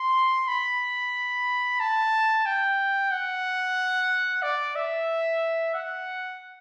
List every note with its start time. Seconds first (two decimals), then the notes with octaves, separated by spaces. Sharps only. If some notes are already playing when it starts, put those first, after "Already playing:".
Already playing: C6
0.48 B5
1.80 A5
2.46 G5
3.11 F#5
4.43 D5
4.76 E5
5.74 F#5